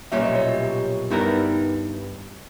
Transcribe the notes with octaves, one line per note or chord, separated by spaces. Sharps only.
B1 A#2 G3 C#4 E5
D#5
C#5
G4
G2 G3 B3 D#4 E4 A#4
D#4